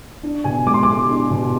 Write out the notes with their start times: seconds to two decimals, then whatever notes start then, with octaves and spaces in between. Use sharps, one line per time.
0.23 D4
0.44 B2 G#5
0.66 G#3 D6
0.74 C6
0.83 G#3 D6
1.09 D4
1.31 B2